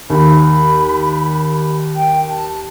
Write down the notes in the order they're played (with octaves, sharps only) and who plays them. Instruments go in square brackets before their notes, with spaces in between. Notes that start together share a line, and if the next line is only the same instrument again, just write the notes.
[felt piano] D#2 [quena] B5
[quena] G5
A5